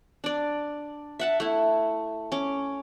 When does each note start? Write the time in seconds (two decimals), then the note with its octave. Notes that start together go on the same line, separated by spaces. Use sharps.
0.24 D4 D5
1.19 E5 F#5 A5
1.40 A3 E4
2.32 C#4 D6